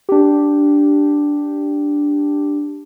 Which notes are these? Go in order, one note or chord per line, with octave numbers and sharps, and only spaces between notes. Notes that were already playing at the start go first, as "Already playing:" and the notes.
D4 G4